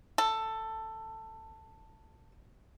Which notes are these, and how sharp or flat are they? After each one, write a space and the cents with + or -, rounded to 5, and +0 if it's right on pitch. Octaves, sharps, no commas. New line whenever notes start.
A4 +10